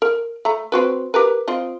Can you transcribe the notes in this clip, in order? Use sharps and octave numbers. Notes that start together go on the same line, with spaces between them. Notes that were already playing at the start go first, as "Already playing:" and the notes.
A#4
A3 A#5
C4 F#4 B4
G4 A#4 B4
C4 F4 D#5